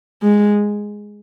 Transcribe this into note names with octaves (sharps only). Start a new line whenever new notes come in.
G#3